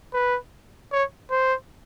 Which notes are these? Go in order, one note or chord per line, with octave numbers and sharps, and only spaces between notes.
B4
C#5
C5